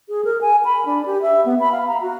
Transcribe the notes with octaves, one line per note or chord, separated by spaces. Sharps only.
G#4
A#4
G#5
B5
D4
G4
E5
B3
B5
F5
A#5
F#4